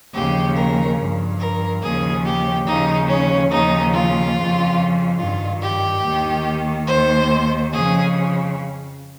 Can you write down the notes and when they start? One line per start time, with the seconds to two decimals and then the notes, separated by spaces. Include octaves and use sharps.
0.14 D#2 C#3 F3 G4
0.56 A#4
0.97 G2 F3
1.40 A#4
1.82 D#2 C#3 F3 G#4
2.24 G4
2.66 D#2 C#3 F3 D#4
3.08 C#4
3.51 D#2 C#3 F3 D#4
3.93 F4
4.35 F2 C#3 F3
5.19 G2 D#3 F4
5.62 G4
6.04 D#2 D#3
6.87 D#2 D#3 C5
7.72 F2 C#3 F3 G#4